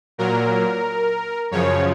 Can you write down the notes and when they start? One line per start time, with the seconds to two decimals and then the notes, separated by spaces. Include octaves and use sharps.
0.18 A#2 F#3 A#4
1.51 F#2 C#3 F3 C#5